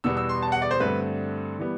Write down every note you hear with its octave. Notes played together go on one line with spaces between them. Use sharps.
E2 B2 G3 B3 E6
E6
C6
A5
F#5
D5
C5
G2 D3 A3 C4 B4
E3 G3 B3